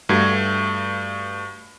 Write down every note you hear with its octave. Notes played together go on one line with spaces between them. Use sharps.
G2 A3 F#4 G#6